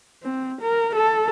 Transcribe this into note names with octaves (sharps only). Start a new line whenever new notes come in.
C4
A#4
A4